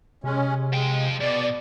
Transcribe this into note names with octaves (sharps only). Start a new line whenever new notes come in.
C3 G#3 C#4
F3 G#3 G5
B2 D5